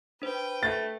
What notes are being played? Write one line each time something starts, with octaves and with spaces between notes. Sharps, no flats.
D4 B4 C5 G5
A3 A6